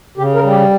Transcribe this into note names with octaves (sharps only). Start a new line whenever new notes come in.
C#3 G4
A#4
G3
G4